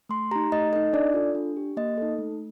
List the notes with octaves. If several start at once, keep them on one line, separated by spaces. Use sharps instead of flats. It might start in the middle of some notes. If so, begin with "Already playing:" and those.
A3 C6
D#4 G4 A#5
A3 D#5
D#4 A4 D#5
D4 D5
F4 A4
D4
G4
A#3 D#5
D#4 A4
A3